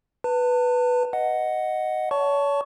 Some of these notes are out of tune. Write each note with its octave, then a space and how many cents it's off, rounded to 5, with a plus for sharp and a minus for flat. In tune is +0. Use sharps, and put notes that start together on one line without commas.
B4 +0 A5 +35
D#5 +0 F#5 +0
C#5 +35 A5 +0 C#6 +10